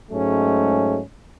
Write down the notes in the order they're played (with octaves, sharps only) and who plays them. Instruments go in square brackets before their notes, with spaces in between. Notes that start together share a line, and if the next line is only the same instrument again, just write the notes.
[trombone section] G#2 F#3 G#3 A3 C#4